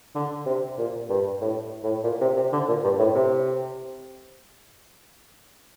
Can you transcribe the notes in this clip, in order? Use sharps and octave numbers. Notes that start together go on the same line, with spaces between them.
D3
C3
A#2
G2
A2
A2
A#2
C3
C3
D3
A#2
G2
A2
C3